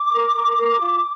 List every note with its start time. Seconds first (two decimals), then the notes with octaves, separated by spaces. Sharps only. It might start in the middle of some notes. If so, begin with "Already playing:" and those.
Already playing: D6
0.12 A#4
0.35 A#4
0.57 A#4
0.80 F4